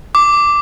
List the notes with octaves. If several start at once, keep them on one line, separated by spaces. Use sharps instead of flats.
D6